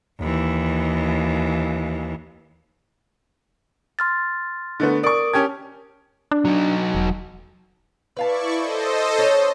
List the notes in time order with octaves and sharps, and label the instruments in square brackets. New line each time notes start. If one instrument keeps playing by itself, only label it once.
[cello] D#2 E3
[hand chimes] C6 F6 A6
[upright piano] D3 A3 B3
[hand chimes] A#4 D#6 D7 [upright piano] D5 C#6
[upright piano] C#4 G4 G#6 [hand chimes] A5 F6
[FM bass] D4
[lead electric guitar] F#3 D#4
[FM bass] E1
[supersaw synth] E4 D5 C#6 [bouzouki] B4 F5 A5
[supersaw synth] A4 C5 D#5
[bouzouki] C#4 A#5